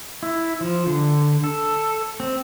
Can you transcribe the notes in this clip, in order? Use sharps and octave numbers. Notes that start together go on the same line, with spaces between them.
E4
F3
D3
A4
C4